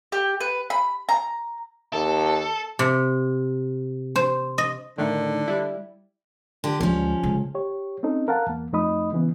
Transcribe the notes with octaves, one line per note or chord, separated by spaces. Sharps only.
G4
B4
B5
A#5
D#2 A4
C3
C5
D#5
A2 D3 D#3
G3 E4
D3 G4
D2 F3 G#3 C#4
C#3 G#3
G4 C#5
C4 C#4 D#4 A4
A#4 F5 F#5 A5 A#5
E2 A#3
F2 A3 D#4 D#5 B5 D#6
C#3 E3 B3